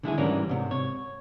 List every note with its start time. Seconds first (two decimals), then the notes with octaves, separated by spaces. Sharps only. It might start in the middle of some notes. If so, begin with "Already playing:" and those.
0.03 D3 G#3 E4 G#4
0.18 G#2 E3 G3 C#4 D4 A#4
0.49 G#2 C3
0.71 C#5